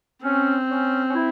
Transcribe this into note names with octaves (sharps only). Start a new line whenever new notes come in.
C4 C#4
C#4
C#4
E4